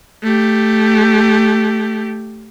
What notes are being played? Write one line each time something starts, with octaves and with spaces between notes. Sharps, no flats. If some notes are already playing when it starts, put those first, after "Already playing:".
A3 G4